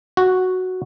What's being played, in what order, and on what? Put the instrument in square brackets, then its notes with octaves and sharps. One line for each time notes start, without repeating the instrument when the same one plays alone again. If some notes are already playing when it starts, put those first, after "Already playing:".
[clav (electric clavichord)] F#4